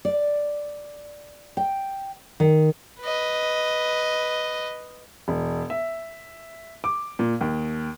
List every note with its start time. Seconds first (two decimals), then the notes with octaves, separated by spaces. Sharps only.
0.05 D5
1.57 G5
2.40 D#3
3.01 B4 D#5
5.28 E1
5.70 E5
6.84 D6
7.19 A#2
7.41 D#2